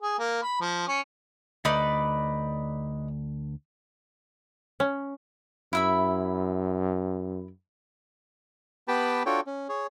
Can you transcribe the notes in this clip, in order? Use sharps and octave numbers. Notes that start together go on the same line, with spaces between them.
G#4
A#3
B5
F3
C#4
D2 D#4 B4 D5
C#4
F#2 E4 E5 B5
B3 G4 B4 G5 A5 B5
D4 F4 F#4 A4 C#5 G5
C#4
G#4 C#5